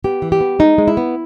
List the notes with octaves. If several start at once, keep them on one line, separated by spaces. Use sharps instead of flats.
B3 G4
E3
G4
B3
G#3 D#4
G#3
E4
B3